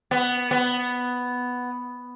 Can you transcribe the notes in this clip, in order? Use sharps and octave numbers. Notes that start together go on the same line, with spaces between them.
B3
B3